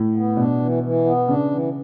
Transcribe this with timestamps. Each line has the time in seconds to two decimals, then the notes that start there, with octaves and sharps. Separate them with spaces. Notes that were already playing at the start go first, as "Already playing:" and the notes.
Already playing: A2
0.15 B3
0.37 B2 D4
0.60 E3
0.83 E3
1.05 B3
1.28 C#3 D4
1.51 E3